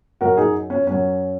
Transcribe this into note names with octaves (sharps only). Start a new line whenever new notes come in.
F#2 F#3 F#4 A#4
D#4 G#4
C#4
F#2 F#3 C#4